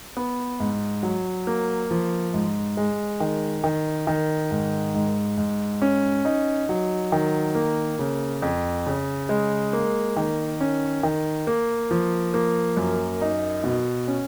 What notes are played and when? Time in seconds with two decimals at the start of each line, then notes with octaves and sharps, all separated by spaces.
0.17 B3
0.60 G#2
1.03 F#3
1.47 A#3
1.91 F3
2.34 G#2
2.77 G#3
3.20 D#3
3.64 D#3
4.07 D#3
4.51 G#2
4.95 G#2
5.38 G#2
5.82 C#4
6.25 D#4
6.69 F#3
7.12 D#3
7.55 A#3
7.99 C#3
8.42 F2
8.86 C#3
9.29 G#3
9.73 A#3
10.17 D#3
10.61 C#4
11.03 D#3
11.47 A#3
11.91 F3
12.34 A#3
12.77 F#2
13.21 D#4
13.64 B2
14.08 C#4